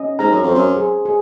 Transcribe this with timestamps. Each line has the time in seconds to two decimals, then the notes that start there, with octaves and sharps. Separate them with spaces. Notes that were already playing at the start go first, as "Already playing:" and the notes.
Already playing: C#4 D#5
0.19 G#2 A#5
0.31 F#2
0.43 F2
0.48 C5
0.55 F#2
0.77 G#4
1.05 G#4